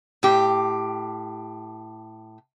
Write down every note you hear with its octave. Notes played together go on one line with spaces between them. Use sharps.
A2 G4